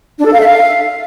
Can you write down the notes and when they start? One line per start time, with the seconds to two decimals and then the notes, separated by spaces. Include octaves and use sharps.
0.18 D4
0.25 A4
0.33 F5
0.40 E5
0.47 F5